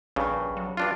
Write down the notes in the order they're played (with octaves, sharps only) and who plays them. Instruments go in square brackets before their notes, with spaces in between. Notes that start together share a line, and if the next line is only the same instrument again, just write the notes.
[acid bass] A#1 [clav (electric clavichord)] G2 C#3
[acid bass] F#3
[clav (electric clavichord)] G2 D4 F4